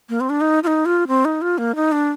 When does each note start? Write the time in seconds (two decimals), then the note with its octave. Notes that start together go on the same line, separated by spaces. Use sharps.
0.09 A#3
0.20 C4
0.30 D4
0.41 D#4
0.63 F4
0.67 D#4
0.85 F4
1.08 C4
1.25 D#4
1.42 F4
1.58 A#3
1.76 D#4
1.92 D4